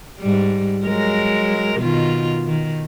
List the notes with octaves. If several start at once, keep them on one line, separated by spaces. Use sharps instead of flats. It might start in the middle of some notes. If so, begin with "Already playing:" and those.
G#2 G3
F#3 G#3 A#4
B2 D#3 F4
D#3